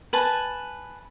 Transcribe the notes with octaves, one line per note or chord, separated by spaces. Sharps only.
B4 G#5 A5